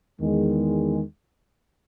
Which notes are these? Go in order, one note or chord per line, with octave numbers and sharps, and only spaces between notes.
E2 D#3 G#3